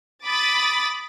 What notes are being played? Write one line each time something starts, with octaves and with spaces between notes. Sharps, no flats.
B5 D6 D#6 A6